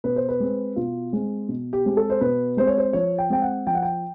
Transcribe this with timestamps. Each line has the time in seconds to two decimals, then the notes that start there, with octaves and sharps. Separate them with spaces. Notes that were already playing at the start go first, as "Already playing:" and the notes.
0.04 B2 B4
0.16 C5
0.28 B4
0.40 G#3 C4
0.76 B2 F4
1.13 G#3 C4
1.49 B2
1.73 G4
1.85 G#3 C4
1.97 A4
2.10 C5
2.21 B2 B4
2.57 G#3 C4 C5
2.67 C#5
2.78 C5
2.93 F3 C#5
3.18 G5
3.30 G#3 C4 G5
3.42 F#5
3.67 F3 G5
3.75 F#5
3.82 G5